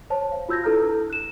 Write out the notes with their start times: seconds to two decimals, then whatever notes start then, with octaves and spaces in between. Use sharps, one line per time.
0.10 C5 C#5 A5
0.32 F5
0.49 F4 F#4 E6 G6 G#6 A#6
0.63 D4 E4 A4 B4 A#5 F6
1.10 F#6 E7